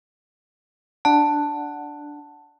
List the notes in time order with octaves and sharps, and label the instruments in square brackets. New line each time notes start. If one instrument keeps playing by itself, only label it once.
[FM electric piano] D4 F#5 [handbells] A5